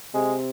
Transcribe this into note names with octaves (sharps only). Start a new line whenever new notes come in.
C3 G#3